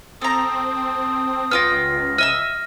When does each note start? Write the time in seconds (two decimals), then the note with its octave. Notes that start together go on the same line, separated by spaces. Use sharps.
0.21 C4 A4 A#5 D#6
1.51 C#2 B3 F4 G5 F6 A#6
2.18 D#5 E5 E6 F6